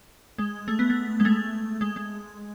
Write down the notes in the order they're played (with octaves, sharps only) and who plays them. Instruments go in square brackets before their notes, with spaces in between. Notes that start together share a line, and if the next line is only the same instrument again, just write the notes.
[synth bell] G#3
A3
B3
A3
G#3
A3
G#3
G#3